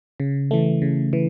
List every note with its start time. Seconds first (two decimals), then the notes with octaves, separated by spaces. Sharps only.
0.20 C#3
0.51 E3 A3
0.82 C#3
1.13 E3